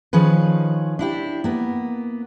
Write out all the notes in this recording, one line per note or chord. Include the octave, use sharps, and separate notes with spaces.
D#3 F3 C#4 G#4 B4
D4 E4 G4
A#3 B3